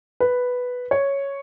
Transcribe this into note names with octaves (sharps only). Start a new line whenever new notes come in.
B4
C#5